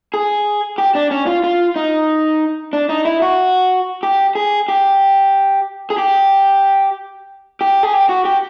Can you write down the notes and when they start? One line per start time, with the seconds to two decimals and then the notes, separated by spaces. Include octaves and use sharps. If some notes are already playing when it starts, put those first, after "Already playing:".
0.14 G#4
0.78 G4
0.95 D4
1.11 C#4
1.27 F4
1.44 F4
1.76 D#4
2.73 D4
2.89 D#4
3.05 E4
3.22 F#4
4.03 G4
4.35 G#4
4.68 G4
5.90 G#4
5.98 G4
7.61 G4
7.83 G#4
7.93 G4
8.09 F#4
8.25 G4